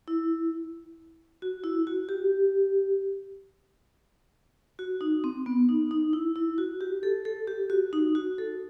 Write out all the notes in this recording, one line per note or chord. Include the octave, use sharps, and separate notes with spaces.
E4
F#4
E4
F#4
G4
F#4
D#4
C4
B3
D#4
D#4
E4
E4
F#4
G4
A4
A4
G4
F#4
D#4
F#4
A4